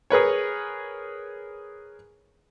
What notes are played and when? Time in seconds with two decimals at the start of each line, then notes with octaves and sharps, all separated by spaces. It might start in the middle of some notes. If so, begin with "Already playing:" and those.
0.10 G#4 A#4 B4 C#5